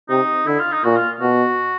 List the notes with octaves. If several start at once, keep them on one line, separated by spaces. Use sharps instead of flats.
C3 D#4
D3 E4
F4
D#4
A#2 F#4
F4
B2 F#4